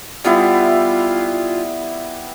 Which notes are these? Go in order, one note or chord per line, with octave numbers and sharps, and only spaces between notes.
G3 B3 E4 F4